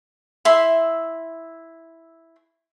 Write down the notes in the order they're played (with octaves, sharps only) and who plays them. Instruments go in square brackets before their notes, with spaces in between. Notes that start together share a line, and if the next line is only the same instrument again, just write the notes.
[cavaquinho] E4 E5 C6